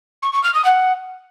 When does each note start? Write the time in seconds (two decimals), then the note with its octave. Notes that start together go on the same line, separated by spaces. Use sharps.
0.22 C#6
0.33 C#6
0.43 F6
0.54 D#6
0.64 F#5